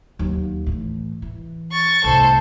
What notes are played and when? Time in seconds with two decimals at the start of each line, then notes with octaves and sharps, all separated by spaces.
0.19 D#2 F#3
0.66 A2 E3
1.22 E3
1.72 C#6 A6
2.04 C2 A2 A4 C5